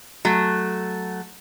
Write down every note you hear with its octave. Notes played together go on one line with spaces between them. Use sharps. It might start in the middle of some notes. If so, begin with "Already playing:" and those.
F#3 A3